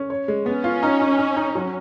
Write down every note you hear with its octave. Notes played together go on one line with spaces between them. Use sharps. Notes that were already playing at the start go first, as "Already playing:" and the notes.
Already playing: C#4
C#5
G#3
B3 C#4
F4
D#4
D#4
D#4
D#4
F#3